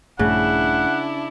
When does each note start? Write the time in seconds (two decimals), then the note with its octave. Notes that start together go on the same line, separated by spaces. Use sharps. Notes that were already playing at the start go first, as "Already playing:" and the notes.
0.19 A#1 G2 C#3 A3 D4 E4 F#5